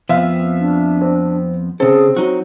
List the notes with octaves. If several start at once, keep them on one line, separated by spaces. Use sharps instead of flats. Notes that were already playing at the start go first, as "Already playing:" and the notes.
F2 F3 B3 C4 E5 F5
D4
C4
C#3 C4 G#4 A4
F#3 D#4 F#4